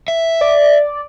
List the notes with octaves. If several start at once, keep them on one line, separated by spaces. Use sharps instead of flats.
E5
D5